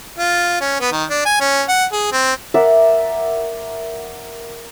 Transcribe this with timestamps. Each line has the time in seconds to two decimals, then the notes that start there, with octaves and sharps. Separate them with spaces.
0.18 F4
0.61 C#4
0.80 B3
0.92 D#3
1.09 D4
1.25 G#5
1.40 C#4
1.69 F#5
1.93 G#4
2.12 C4
2.54 A#4 D5 E5 F#5